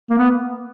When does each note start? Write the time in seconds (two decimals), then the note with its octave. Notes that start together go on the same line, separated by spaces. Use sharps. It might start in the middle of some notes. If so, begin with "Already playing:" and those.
0.10 A#3
0.19 B3